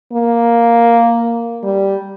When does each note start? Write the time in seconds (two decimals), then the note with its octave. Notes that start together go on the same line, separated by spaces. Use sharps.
0.13 A#3
1.63 G3